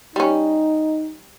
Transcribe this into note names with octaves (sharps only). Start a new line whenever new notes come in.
G3 C#4 D#4